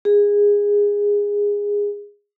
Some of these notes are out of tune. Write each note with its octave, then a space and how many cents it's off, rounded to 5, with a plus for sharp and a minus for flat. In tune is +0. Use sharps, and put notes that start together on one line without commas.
G#4 -20